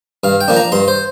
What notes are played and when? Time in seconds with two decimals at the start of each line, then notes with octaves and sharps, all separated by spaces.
0.24 G2 F5
0.41 G5
0.48 F3 A#3 D4
0.56 A#5
0.72 G2 C6
0.88 C5